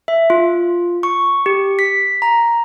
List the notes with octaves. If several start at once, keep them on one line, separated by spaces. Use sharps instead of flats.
E5
F4
C#6
G4
B6
A#5